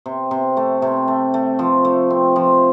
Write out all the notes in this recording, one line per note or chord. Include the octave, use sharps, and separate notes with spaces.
C3
C3
A3
C3
A3
A3
F3
A3
C4
F3